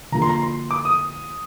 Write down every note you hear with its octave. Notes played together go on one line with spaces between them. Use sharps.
D3 F3 A#3 F4 G#4 A#5
C6
A#5
C6
D6
D#6